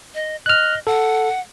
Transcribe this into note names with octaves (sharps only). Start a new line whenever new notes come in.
D#5
D#5 F6 F#6
A4 F#5